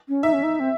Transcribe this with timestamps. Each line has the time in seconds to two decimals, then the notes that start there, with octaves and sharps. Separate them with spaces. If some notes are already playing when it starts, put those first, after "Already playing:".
0.08 C#4
0.23 D#4 E5
0.33 C#4
0.43 D#4
0.60 C4